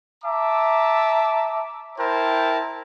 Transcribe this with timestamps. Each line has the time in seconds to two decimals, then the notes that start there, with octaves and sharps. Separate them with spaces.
0.24 E5 A5 A#5 D6
1.98 E4 A#4 C5 G5 A5